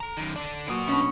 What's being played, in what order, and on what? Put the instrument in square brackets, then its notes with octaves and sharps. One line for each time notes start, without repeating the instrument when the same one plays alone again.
[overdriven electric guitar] A4 A#5
F#2 D#3
D3 D4
[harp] A#2 F#3 D#6 [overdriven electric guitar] B3 F#4
[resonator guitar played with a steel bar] B2 C#4 D#5